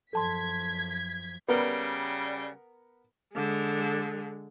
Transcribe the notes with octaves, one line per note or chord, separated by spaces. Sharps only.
F#2 F3 A4 A5 C6 G#6 B6
C#3 G3 B3 A#4
D3 G#3